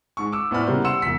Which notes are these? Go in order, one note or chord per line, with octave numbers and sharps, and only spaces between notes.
G#2 C#6
D6 E6
A2 B3 C5 D5 B5 F6
C#3 G3 A#3 B3 G4 C5
F#5 C6 E6 C#7 E7
E1 B6